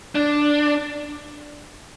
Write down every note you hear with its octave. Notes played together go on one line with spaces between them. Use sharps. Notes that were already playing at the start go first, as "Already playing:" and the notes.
D4